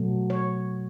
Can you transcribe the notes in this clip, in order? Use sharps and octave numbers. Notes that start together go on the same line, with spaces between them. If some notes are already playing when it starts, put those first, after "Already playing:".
Already playing: B2 F#3 A3
C#5